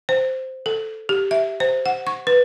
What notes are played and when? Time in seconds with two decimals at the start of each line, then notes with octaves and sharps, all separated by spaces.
0.09 C5
0.66 A4
1.09 G4
1.31 E5
1.60 C5
1.86 F#5
2.07 C#6
2.27 B4